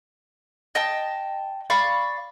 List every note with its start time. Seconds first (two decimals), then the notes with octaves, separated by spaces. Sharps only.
0.75 D#5 G5 A5
1.70 D5 F5 B5 C#6